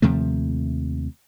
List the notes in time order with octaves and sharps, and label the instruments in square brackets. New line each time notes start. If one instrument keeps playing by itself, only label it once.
[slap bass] D#2 C3 F3 A3